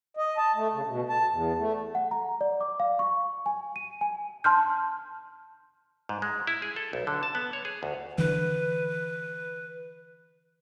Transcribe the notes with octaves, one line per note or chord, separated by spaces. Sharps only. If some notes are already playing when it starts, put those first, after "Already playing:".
D#5
A5
A3
C#3
B2
A5
E2
A3
F#5
A#5
D5
D6
F5
C#6
G#5
D#7
G#5
A5 C6 F6 G6
G#2
G#3
E4
G#4
A4
B1
D3
A5
B3
C#5
G#4
D2
D3 E3 B4